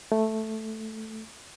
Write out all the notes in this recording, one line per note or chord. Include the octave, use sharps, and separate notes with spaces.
A3